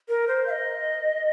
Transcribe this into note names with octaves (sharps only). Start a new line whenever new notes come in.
A#4
C5
F5
D#5